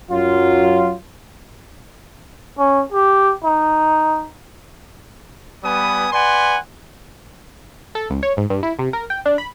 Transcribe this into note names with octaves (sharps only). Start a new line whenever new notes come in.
F#2 F#3 F4
C#4
G4
D#4
G3 B3 B4 G#5 D#6
B4 D5 F#5 G#5 C6
A4
C#2
C#5
G#2
G2
E4
C3
A#4
G5
D4
B5